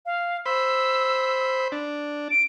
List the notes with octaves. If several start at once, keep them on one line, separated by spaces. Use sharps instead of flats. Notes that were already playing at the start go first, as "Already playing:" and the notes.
F5
C5 B5 E6
D4
D7